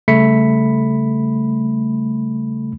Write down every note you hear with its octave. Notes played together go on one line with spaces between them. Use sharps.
C#3 G3 A3 B5 B6 C#7